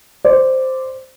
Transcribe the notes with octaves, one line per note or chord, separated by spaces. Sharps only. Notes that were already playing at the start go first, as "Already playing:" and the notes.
C5 D5